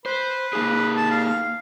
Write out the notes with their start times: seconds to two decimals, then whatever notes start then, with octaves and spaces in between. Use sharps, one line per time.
0.06 B4 C5
0.53 A#3 D#4 G#4
0.96 A5
1.11 F5